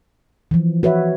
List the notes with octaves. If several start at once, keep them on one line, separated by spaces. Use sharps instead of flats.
E3 F3
F#4 B4 C#5 E5